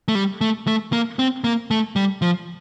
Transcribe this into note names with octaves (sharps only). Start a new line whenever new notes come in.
A3
G3
A3
A3
A#3
C4
A#3
A3
G3
F3